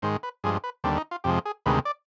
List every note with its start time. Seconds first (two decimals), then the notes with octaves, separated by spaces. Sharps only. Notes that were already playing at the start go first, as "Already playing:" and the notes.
0.02 G#2 D#3 G#3 C5
0.23 B4
0.44 G2 F3 G#3 G#4
0.64 B4
0.84 D#2 D3 G3 C4
0.97 D#4
1.11 F4
1.24 F2 C3 F3 G#3 G4
1.45 G#4
1.66 D2 C3 D#3 G#3 B4
1.85 D5